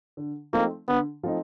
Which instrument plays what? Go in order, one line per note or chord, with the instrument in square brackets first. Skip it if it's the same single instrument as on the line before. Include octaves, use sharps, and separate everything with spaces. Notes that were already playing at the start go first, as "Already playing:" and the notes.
[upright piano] D3
[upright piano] F3 A3 C4 D#4 [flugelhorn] A#3
[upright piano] D3 [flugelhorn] B3
[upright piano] F3 A3 C4 D#4